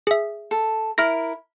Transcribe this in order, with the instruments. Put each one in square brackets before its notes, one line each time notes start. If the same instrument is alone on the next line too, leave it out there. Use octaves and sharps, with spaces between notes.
[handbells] G#4 E5
[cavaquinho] A4
[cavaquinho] E4 A#4 [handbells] F6 A#6